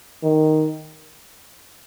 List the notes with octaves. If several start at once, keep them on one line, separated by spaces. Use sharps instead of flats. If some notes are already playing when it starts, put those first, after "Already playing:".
D#3